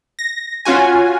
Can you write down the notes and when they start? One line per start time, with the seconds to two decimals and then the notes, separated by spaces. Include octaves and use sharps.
0.19 A#6
0.65 C#4 F4 F#4 G#5